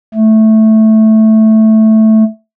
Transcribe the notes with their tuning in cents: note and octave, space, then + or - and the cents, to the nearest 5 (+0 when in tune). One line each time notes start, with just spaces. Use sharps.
A3 -5